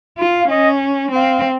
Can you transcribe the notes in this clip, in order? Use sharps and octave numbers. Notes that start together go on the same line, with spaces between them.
F4
F5
C#4 D#5
C4 F5 G5